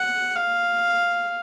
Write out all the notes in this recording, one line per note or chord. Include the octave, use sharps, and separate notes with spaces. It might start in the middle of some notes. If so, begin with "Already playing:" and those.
Already playing: F#5
F5